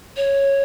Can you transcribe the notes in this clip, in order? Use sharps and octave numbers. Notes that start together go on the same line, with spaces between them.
C#5